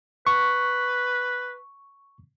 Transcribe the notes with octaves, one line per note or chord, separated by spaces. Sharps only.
B4 C#6